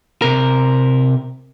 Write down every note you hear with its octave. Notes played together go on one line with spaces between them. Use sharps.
C3 A#4